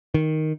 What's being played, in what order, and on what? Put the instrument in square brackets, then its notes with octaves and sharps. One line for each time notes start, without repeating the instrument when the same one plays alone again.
[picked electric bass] D#3